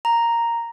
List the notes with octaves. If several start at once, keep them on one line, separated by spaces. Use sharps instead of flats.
A#5